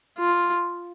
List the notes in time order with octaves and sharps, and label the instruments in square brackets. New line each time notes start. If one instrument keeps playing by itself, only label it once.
[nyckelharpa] F4